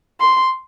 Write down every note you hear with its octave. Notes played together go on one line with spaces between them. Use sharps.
C6